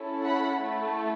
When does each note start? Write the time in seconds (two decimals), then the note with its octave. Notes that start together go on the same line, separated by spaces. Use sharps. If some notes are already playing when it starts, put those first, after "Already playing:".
Already playing: C#4 E4 A4
0.24 F#5 B5
0.61 A3 E4 A4